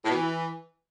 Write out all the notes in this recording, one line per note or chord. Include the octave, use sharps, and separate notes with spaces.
A2
B2
E3